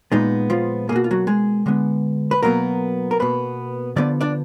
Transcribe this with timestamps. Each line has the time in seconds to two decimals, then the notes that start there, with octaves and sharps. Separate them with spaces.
0.12 A#2 G#3 B3 D#4
0.50 F3 F4
0.89 A#3 G#4
0.92 B2 F#4
1.04 F4
1.11 F#3 F#4
1.27 G#3 G#4
1.66 D3 G#3 B3
2.31 B4
2.42 B2 F#3 A#3 B3 A#4
3.11 A#4
3.20 B2 A#3 B3 B4
3.96 D3 F3 B3 D5
4.21 D4 D5